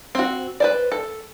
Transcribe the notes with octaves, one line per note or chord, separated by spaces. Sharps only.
C4 F#4
B4 C5 D5
A4